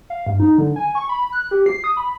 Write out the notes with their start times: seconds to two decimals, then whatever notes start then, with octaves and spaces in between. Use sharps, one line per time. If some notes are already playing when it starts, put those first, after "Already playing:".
0.10 F5
0.27 G2
0.40 D#4
0.58 D3
0.76 G#5
0.95 C#6
1.09 B5
1.33 F#6
1.51 G4
1.66 C7
1.84 D#6
1.97 B5